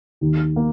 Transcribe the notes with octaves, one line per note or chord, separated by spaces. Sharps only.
D#2 D#3
A#3